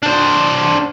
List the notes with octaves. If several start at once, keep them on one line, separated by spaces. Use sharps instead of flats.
D4 C5